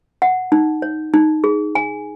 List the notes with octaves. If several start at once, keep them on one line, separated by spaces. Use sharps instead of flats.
F#5
D#4
C#5
D#4
G#4
G#5